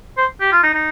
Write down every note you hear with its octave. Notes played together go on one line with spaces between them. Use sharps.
C5
G4
F4
D#4
D#4